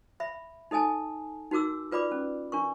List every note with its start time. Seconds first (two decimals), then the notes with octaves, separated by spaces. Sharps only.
0.20 E5 B5
0.71 D#4 A4 D#5 G#5 A5
1.51 D#4 F#4 A#4 D6 E6
1.92 F4 B4 D5 B5 D6
2.12 C#4
2.52 D4 A#4 C#6